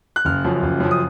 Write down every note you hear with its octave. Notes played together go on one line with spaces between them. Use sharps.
F#6
F#1 F6
F#2 F3
F#1
F#2 F3
D#6